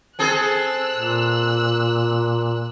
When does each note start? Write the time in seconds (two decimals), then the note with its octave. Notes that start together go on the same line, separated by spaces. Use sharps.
0.19 C4 G#4 A4 E6 F#6
0.94 A#2